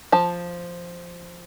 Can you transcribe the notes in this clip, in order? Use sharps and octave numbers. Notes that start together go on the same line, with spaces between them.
F3 A5